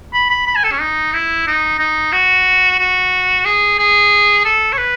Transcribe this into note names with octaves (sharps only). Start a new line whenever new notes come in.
B5
B5
B5
G#5
A4
C#4
D#4
E4
D#4
D#4
F#4
F#4
G#4
G#4
A4
C#5
B4